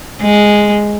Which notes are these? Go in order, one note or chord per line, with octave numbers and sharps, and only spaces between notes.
G#3